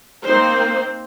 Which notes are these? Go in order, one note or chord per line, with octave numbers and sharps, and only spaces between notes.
A#3 C4 D#4 C5